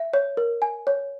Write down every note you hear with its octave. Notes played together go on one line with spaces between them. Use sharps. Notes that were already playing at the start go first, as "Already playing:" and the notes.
Already playing: E5
C#5
A#4
G#5
C#5